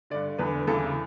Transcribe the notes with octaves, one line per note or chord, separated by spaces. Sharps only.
G2 D3 D5
E2 D3 B4
E2 C#3 E3 A4